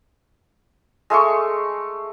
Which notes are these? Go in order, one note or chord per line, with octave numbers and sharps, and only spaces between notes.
G#3 A3 C6 C#6